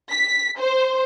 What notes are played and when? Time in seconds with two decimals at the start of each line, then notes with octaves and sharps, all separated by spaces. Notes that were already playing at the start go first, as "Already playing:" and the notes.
0.11 B6
0.59 C5